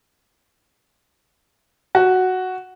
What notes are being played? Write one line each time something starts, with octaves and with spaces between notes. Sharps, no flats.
F#4